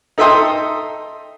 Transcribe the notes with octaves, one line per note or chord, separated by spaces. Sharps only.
D#4 A4 E5 G5 C6 D#6